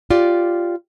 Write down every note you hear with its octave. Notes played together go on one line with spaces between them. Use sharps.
F4 G4 D5